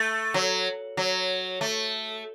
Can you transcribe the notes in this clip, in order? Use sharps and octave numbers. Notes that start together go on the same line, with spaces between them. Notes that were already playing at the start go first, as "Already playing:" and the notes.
Already playing: A3
F#3
F#3
A3